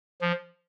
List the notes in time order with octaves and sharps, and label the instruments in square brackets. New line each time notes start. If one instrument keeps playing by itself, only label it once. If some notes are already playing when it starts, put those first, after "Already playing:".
[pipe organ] F3